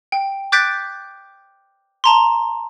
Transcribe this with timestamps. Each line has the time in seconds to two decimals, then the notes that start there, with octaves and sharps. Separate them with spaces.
0.12 G5
0.52 D6 F#6 G6 A6 B6 D7
2.04 A5 A#5 C6